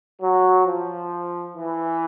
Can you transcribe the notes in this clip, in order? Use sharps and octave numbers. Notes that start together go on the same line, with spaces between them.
F#3
F3
E3